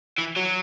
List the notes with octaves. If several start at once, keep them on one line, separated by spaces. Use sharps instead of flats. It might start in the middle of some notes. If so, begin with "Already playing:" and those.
E3
F#3